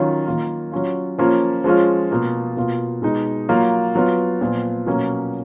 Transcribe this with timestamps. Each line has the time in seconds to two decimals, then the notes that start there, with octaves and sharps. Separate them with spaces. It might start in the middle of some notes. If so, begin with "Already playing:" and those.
Already playing: D#3 F#3 C#4 F4
0.26 D#3 A#3 F4
0.72 F#3 C#4 F4
1.18 F3 A#3 C#4 F4
1.64 F3 G#3 C#4 F4
2.11 B2 A#3 F4
2.57 B2 A#3 F4
3.02 B2 G#3 D#4
3.49 F#3 A#3 F4
3.95 F#3 B3 F4
4.41 A#2 F3 B3 F4
4.86 B2 F#3 A#3 C#4